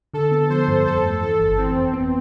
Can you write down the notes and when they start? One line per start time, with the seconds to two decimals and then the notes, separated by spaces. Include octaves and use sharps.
0.14 D3 A4
0.31 B3
0.50 F3 C5
0.68 G2
0.86 F2 A4
1.04 A3
1.22 E3 A4
1.40 G1
1.58 E3 C4
1.76 F2
1.93 B3